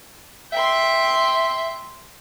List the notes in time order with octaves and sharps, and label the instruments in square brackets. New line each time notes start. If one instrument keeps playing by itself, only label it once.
[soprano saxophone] E5 [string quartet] G5 C6